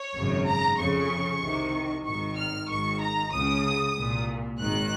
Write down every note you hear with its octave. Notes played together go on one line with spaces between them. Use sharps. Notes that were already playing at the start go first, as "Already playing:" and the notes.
Already playing: C#5
G#1 F#2 C#3
A#5
F2 C#3 C#6
C2 C3 D#3
G#1 G#2 D#3 C#6
F6
G#1 G#2 D#3 C#6
A#5
C#2 C#3 D#6
C2 A#2
G#1 G#2 D#3 F#6